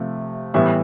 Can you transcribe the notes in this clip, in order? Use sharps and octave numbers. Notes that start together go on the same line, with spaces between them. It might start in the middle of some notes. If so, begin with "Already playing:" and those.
Already playing: C3 F3 A3
A2 E3 G3 B3 E5